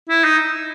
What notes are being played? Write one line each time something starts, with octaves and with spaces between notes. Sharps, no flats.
E4
D#4